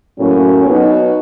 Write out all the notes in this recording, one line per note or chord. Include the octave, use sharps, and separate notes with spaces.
A2 F#3 A#3 C#4
B2 F#3 B3 D#4 F#4